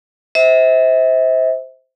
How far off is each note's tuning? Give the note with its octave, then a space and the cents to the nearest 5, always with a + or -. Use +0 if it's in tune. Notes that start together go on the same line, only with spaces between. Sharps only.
C5 -5 E5 -35